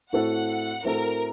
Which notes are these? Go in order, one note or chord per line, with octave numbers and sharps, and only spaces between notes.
A2 A3 C4 F#4 A4 F#5
A2 A3 C4 F#4 A4 A#4